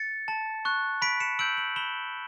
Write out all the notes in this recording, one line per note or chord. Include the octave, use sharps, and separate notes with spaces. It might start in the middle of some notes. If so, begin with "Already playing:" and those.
Already playing: A6 C#7
A5
C#6 F#6
B5 B6 D7
C#7 E7
E6 G6 D7 F#7
D7 F#7
B5 E7 G7